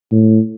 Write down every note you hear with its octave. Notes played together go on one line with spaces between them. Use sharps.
A2